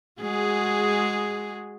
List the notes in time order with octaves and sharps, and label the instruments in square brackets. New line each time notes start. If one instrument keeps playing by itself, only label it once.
[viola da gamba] G#3 F#4 G#4